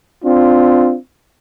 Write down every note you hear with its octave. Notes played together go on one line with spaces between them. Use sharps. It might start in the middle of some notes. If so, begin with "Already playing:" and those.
C4 D4 F4